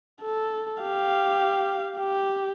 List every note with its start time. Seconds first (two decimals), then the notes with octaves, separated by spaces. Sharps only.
0.22 A4
0.82 G4 F5
1.97 G4